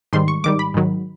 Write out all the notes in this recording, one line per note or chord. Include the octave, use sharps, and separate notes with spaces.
G#2 D#3 G3 C6
C#6
G#2 D#3 G3 D6
B5
G#2 D#3 F#3